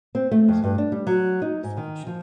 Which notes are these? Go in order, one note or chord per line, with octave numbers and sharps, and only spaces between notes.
C4
A3
F2
G2
D4
G3
F#3
D#4
G#2
D#3
F3